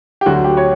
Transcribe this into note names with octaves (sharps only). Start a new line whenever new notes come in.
G4
D2 D3 F#3 F#4
G4
C#5